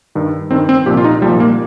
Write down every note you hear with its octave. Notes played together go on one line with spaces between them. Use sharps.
G2 D#3
G2 D#3 C4
C4
C2 A#2 F3 G4
F4
D#4
C2 A#2 F3 G3
A#3